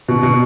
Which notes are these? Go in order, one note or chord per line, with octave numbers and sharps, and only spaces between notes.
B2
B2